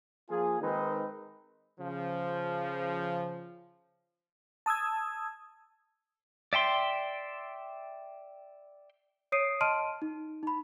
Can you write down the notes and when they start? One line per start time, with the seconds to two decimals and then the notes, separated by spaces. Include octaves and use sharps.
0.29 F3 A#3 F4 G#4
0.61 D#3 G#3 C4 D#4 A#4 B4
1.79 C#3 F3
4.66 A5 D#6 E6 G#6
6.53 D5 E5 G5 C6
9.32 C#5 D#6 C7 D7 D#7
9.61 D#5 A5 C6 F6 D7 D#7
10.02 D#4
10.43 D#4 B5